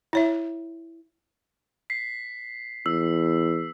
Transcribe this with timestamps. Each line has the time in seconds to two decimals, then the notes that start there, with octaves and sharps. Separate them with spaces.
0.13 E4 C#5 E5
1.90 B6 C7
2.86 E2 E6